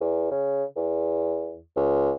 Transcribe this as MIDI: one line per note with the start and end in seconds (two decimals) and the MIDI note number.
0.01 0.30 40
0.31 0.64 49
0.76 1.61 40
1.76 2.12 37